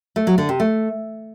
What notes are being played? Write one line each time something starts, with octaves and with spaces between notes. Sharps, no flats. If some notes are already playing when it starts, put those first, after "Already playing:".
A3
F#3
D3
C3
A3